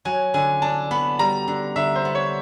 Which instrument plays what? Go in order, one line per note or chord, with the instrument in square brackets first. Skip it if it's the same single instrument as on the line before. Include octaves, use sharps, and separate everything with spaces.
[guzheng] F#3 [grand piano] G#5
[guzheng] D3 [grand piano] G#5
[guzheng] D4 [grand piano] A5
[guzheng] B3 [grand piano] B5
[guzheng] G3 [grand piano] A#5
[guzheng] D3
[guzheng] D3 [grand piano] E5
[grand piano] C5
[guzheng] B3
[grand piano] C#5